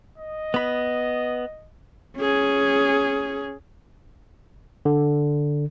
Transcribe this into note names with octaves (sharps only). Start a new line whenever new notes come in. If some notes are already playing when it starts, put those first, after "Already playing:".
D#5
B3 B5
C#4 G#4
D3